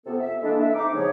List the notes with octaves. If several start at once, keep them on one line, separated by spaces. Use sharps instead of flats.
F2 C3 B3 A4
E5
E3 G#3 A#3 D4 A4
E5
C3 D#4 D6
E2 G#2 C#3 F3 G#4 C#5